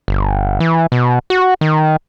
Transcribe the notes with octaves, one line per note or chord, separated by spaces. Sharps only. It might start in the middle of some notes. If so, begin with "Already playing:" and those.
G1
E3
B2
F#4
D#3